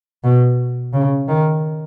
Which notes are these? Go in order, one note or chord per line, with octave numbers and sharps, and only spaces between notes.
B2
C#3
D#3